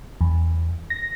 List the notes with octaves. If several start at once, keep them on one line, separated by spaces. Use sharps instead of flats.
E2
A#6